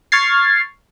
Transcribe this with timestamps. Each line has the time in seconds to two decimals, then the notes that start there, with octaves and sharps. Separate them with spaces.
0.12 C#6 F6 G#6 A6 C7